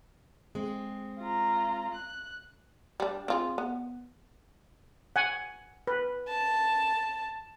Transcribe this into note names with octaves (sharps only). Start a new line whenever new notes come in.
G#3 C4
F4 A#5
F#6
G3 D4
C4 F4 G#4
B3
F#5 G#5
B4
A5